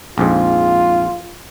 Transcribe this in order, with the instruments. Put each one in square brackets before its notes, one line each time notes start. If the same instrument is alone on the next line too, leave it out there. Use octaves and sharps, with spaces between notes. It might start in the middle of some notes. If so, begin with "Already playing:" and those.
[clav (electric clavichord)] A#1 F2 G#2 [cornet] F4